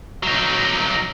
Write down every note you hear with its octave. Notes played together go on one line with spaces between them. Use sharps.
F#3 D#4